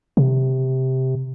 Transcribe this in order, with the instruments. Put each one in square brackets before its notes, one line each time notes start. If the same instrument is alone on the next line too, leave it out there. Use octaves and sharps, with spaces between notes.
[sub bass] C3